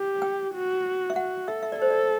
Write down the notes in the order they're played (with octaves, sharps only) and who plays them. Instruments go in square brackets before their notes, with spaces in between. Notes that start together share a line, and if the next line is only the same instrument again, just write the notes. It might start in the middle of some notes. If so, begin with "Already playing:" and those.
Already playing: [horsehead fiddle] G4
[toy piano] G5
[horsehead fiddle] F#4
[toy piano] E5
[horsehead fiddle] F#4 [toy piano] F#5
[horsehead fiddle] A4 [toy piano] E5
[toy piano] E5
D5
[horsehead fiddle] A4 [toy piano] C5
[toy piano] D5